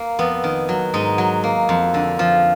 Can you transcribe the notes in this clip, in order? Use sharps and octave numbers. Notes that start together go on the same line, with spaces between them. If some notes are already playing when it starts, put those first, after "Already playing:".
Already playing: A#3
F2 B3
D#3
F#3
G#2 D#4
F#3
A#3
F2
D3
F3